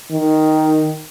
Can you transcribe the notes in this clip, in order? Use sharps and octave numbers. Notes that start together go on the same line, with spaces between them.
D#3